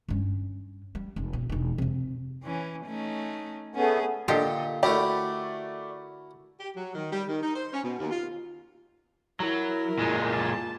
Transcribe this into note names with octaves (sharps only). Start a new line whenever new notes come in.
G2 C#4
G3
F1
B2
E1 D#4
F2 C3
E3 C#4
A3 C#4 D#4
A3 B3 C#4 G#4
A#2 D3 F4 G4 A4 D#5
A3 E4 F#4 G4 A#4 D5
G4
F#3
D#3
G3
D#3
D#4
C5
C#4
B2
D#2
F4
F#3 E4 A#4
A#2 G#3
A5